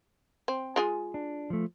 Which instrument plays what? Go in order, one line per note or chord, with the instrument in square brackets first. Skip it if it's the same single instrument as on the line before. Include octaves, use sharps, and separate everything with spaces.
[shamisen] C4
G#3 F4 G#4
[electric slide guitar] D4
F3 A3